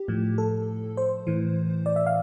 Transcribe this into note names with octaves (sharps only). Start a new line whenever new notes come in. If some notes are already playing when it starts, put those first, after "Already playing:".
Already playing: G4
A2 F3
A4
C5
A2 E3
D5
E5
F5